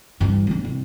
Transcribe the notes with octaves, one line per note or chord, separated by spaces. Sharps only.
G2 E3
B3 D4
C2